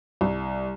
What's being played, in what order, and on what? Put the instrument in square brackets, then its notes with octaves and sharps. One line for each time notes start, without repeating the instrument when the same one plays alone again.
[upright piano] C2